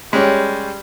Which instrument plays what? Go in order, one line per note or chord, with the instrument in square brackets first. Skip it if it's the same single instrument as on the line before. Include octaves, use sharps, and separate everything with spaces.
[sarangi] G3 [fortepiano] G#3 C#4